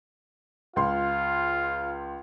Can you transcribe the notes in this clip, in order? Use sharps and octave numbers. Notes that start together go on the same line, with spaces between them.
C#2 F4 C6